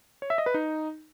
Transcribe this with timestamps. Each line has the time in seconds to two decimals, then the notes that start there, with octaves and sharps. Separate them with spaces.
0.22 C#5
0.30 E5
0.38 D#5
0.46 B4
0.54 D#4